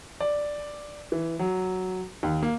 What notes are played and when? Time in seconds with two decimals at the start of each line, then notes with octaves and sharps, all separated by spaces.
0.20 D5
1.12 E3
1.39 F#3
2.23 D#2
2.43 A#3